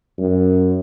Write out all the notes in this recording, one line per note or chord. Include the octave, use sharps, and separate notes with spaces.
F#2